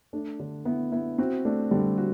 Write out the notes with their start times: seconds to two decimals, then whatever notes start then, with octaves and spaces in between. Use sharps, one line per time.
0.13 A3 D4
0.40 D3
0.65 B3 E4
0.92 B3 E4
1.18 C4 F#4
1.45 A3 D4
1.71 D3 G3
1.98 A3 F#4